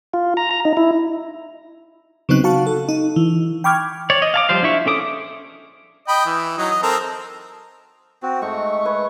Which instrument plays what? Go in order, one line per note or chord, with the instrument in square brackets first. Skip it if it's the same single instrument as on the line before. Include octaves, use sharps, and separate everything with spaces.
[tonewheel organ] F4
A#5
A#5
D#4
E4
[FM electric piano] C#3 F#3 B3 C4 D#4 F#6
F#4 F5 A5 C#6
A4
D#4
E3
G5 B5 C#6 D6 F6 G#6
[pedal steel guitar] C#5 D5
D#5
F5 A5 D6
F3 G3 C5 F5
D4 E4 E5 C#6
C#4 A4 D6 D#6
[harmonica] D#5 G5 B5
E3
F#3 D#4
D#5
C4 A4 A#4
[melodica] C4 F#4
[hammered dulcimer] G#2 [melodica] A3 C#6
[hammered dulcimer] B4 C#5